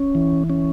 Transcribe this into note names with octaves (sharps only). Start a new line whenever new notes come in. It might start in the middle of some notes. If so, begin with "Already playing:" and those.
Already playing: C#4
E3
C#4